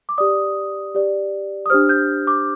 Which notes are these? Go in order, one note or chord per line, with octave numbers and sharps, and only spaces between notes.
D6
G4 D5 D#6
G4 D5
D#6
D4 G4 C5 F6
G6
D6